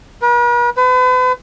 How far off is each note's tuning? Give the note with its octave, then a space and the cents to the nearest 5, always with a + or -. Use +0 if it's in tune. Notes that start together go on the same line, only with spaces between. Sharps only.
B4 -45
B4 +40